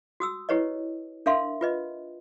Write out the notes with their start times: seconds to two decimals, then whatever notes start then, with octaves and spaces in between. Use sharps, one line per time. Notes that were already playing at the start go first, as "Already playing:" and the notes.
0.20 F#4 D#6 E6
0.49 E4 G4 B4 C#5 D#5
1.26 D4 A#4 E5 F5 C6
1.61 F4 B4 D#5